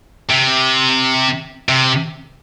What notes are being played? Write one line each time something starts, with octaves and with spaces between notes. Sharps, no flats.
C3
C3